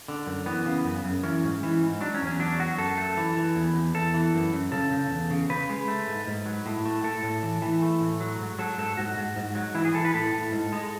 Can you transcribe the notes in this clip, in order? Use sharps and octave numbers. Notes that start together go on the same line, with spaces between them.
D3
F#2
E3 B3
C#3
F#2
F#2
E3 C#4
G#2
E3
G#2
F#3 D4
C#4
E2
C#4
F#3 D4
F#3 F#4
F#2 A4
A3
E3
E3
E2
E2
E2 A4
E3
F#2
F#2
C#3 A4
C#3
E2
C#3
C#3 B4
G#3
A3
G#2
G#2
F#3
A2
A3
A2 A4
A2
E3
E3
A3
A2
F#3
G#2
F#3 A4
G#2 A4
G#2 F#4
G#2
G#2
F#3
E3 E4
G#4
E3 A4
B4
A2 A4
A2
G#2
G#3